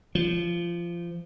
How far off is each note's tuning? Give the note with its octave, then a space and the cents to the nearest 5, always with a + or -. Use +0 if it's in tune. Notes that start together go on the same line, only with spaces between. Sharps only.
F3 -20